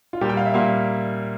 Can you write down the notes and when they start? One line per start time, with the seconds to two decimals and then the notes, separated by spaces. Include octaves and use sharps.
0.13 F4
0.21 A#2 G3 A#3 G4
0.29 G5
0.37 F5
0.45 E5
0.54 A#2 G3 A#3 F5